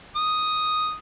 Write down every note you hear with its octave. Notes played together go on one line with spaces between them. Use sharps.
D#6